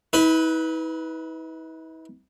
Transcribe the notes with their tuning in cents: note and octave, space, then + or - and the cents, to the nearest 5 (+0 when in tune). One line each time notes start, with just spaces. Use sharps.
E4 -45 B4 +0